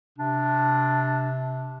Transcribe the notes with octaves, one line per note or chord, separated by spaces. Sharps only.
C3 D4